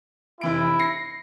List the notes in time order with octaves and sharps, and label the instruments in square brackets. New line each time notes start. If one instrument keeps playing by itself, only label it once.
[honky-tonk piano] F1 E3 D7 [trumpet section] E4
[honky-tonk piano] A#6 C7 C#7